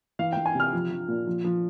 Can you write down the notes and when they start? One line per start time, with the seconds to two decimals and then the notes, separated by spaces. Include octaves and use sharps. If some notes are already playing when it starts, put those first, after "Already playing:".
0.19 E3 F5
0.32 E3 G5
0.46 G#5
0.55 C3 F6
0.73 F3
0.91 F3
1.08 A#2
1.27 F3
1.44 F3